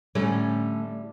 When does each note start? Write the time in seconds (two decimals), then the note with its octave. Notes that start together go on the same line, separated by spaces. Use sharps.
0.15 A2 D3 G3 A3 C#4